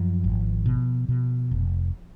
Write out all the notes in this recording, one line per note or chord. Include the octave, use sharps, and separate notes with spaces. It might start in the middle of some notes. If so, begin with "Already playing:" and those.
Already playing: F#2 F3
G#1
B2
B2
F1